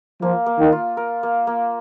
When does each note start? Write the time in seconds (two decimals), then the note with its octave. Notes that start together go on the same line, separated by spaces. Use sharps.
0.22 F3 A#3
0.46 A#3
0.59 D#3
0.72 F4
0.97 A#4
1.23 A#3
1.47 A#3